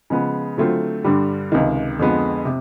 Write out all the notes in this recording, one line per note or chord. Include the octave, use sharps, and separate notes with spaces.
C#3 F3 G#3 B3
D3 F#3 A3 C4 F4
G2 D3 G3
C#2 C3 D#3
F2 D3 F3 G#3 B3
C3